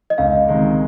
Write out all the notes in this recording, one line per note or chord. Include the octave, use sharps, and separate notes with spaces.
D#5
C#2 F5
C3 D#3 G#3